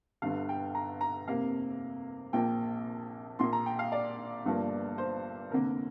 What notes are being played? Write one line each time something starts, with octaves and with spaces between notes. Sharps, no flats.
G1 G2 D3 F5
G5
A#5
A#5
F1 F2 C3 A#3 F5
A#1 A#2 F3 A#3 G5
A#1 A#2 A#3 C6
A#5
G5
F5
D5
G1 G2 F3 A#3
C5
F1 F2 D3 A#3 A#4